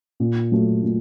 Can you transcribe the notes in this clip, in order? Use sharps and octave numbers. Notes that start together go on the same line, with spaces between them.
A#2
F#3 A3
A#2